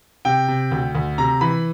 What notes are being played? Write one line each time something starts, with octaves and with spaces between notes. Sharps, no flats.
C3 G5
C3
D2
D2
C3 A#5
E3 B5